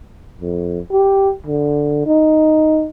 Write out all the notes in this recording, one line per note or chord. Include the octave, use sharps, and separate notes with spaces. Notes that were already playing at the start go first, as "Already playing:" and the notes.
F2
G4
D3
D#4